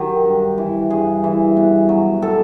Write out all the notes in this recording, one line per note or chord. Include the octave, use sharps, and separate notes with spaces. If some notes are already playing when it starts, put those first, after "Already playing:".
Already playing: D#3 F#3 G4
G2
E3
G2 G#4
E3
B2
F#3
B2 A4